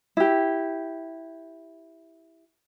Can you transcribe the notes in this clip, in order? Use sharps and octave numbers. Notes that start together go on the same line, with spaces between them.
E4 G4